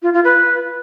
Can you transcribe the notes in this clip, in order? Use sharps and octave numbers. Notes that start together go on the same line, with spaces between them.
F4
F4
B4